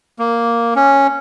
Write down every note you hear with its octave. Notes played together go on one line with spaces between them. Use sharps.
A#3
C#4